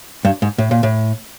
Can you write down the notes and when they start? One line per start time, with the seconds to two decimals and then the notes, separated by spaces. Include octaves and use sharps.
0.25 G2
0.42 G#2
0.58 A2
0.71 A#2
0.83 A2